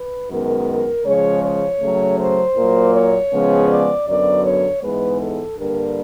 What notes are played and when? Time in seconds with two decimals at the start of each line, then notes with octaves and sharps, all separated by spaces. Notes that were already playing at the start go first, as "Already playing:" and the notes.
Already playing: B4
0.30 F#2 D#3 G#3 B3 A#4
1.05 C#3 F3 G#3 C#5
1.43 C#5
1.81 C#3 F#3 A3
2.18 C5
2.57 A#2 F#3 A#3
2.94 C#5
3.32 C#3 F3 G#3 B3
3.69 D5
4.07 F#2 D3 F#3 B3 D5
4.45 C#5
4.83 G#2 E3 G#3 B3 B4
5.21 A4
5.58 G2 D3 G3 A#3 A#4